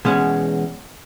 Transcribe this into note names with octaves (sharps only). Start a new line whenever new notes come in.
E2 B2 G#3 C#4